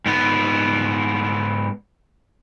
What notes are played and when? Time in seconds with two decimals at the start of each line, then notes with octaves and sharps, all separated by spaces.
0.06 G#2 B3